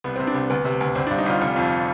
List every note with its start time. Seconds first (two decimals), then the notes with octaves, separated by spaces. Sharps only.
0.04 C2 B3
0.16 C4
0.20 C3
0.27 D4
0.35 C2
0.50 D2 B3
0.65 C3
0.80 D2
0.95 G1 C4
1.07 D4
1.10 G2
1.18 D#4
1.26 G1 F4
1.41 F1
1.56 F2